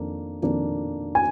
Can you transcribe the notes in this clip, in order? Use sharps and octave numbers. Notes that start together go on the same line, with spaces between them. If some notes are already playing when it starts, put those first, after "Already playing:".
Already playing: F2 D#3 A#3 D4
F2 D#3 A#3 D4
G#5